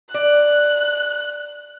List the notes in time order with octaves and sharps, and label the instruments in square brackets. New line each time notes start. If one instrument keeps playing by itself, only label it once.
[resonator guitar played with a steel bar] D5 [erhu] F#6